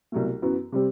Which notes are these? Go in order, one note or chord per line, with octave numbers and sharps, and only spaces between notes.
C2 B2 F#3 A3
F#2 E3 B3 F#4
C3 G3 C4 G4